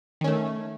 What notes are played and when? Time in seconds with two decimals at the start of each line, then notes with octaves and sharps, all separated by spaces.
0.21 D#3
0.24 C#4
0.27 A3